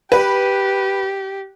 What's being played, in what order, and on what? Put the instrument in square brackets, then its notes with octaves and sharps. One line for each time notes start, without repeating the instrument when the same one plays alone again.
[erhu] G4 [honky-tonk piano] B4